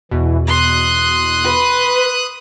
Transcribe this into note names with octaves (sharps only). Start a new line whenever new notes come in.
E2 B2 E3
C6 D#6 F#6
B4